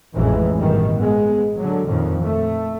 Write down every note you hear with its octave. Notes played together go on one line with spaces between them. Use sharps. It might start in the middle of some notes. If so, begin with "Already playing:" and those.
A1 F2 E3 G#3
G2 B2 D#3 G3
G#3 B3
D3 F#3
F2 A#2 D#3
A3